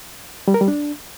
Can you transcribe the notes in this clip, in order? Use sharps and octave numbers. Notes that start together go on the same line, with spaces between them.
G3
A#4
G3
D4